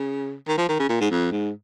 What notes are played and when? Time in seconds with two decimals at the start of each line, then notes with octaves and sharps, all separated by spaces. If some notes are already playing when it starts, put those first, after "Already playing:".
Already playing: C#3
0.47 D#3
0.58 F3
0.69 D#3
0.79 C#3
0.89 A#2
1.01 G#2
1.11 F2
1.32 G#2